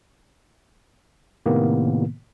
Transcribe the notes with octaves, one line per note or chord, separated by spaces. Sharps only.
A2 C3 D#3 A#3 B3